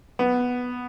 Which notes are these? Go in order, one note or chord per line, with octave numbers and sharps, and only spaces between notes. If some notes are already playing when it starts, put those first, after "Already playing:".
B3